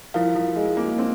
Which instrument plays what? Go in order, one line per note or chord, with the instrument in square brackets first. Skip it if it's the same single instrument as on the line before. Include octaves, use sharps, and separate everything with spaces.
[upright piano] F3 [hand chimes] E4 A#4 F5
[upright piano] F3
G#3
A#3
C4